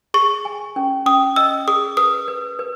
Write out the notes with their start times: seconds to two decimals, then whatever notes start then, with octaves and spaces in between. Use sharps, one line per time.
0.14 G#4 C#6
0.45 G#5
0.76 C#4
1.06 C#4 D#6
1.36 D#5 E6
1.68 G#4 D#6
1.97 B4 D#6
2.28 B4
2.59 B4